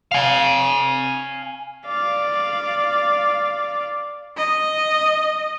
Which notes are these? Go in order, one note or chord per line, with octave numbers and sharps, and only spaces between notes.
F5 G#5
D5 F5
D#5